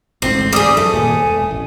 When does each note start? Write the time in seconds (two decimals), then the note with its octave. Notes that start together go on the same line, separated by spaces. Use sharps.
0.22 A1 D2 G#2 C4
0.53 G3 G#4 D#6
0.77 F#2 A3
0.94 D#1 G2 A#2 G#5
1.27 E1
1.51 A1